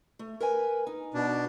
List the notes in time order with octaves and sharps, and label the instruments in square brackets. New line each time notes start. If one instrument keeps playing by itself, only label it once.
[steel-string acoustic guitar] A3
A#4 B4 G#5
D#4
[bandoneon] B2 D4